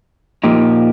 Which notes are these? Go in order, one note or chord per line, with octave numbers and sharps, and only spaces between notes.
A#2 F3 A#3 D#4 G4